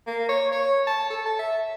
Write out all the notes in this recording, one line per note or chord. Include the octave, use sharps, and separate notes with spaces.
A#3
C#5
C#5
A5
A4
A5
E5